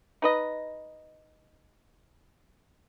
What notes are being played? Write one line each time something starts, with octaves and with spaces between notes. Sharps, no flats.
D#4 B4 D#5